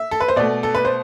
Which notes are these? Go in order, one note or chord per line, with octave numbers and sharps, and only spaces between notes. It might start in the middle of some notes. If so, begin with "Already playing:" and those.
Already playing: E5
A4
B4
C5
B2 A3 D5
A4
B4
C5